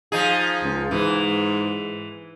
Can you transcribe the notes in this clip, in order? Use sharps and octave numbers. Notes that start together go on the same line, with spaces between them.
F3 D#4 G#4
C#2
G#2 E3